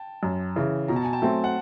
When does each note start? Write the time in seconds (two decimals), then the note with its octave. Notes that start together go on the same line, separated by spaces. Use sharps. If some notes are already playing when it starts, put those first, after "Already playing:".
Already playing: G5 A5
0.23 F#2
0.56 C#3 E3
0.88 B2 A#5
0.96 A5
1.05 G#5
1.13 G5 A5
1.22 F#3 A3 C4
1.44 F#5